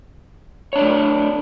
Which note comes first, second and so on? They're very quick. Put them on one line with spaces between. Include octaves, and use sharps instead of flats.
C#5 D4 D5 A3 E4